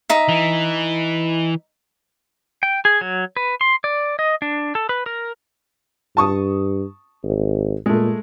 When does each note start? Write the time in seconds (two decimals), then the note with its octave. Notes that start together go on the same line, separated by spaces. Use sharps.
0.09 D#4 E5
0.28 E3
2.63 G5
2.85 G#4
3.01 F#3
3.37 B4
3.61 C6
3.84 D5
4.19 D#5
4.42 D4
4.75 A4
4.89 B4
5.06 A#4
6.17 G2 A5 C#6 D#6
7.24 G#1
7.86 A#2 G#3 A3